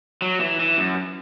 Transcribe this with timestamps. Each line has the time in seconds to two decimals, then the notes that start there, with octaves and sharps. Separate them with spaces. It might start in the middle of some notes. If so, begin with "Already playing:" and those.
0.22 F#3
0.40 E3
0.60 E3
0.78 F#2